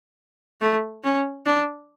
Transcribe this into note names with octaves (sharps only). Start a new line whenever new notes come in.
A3
C#4
D4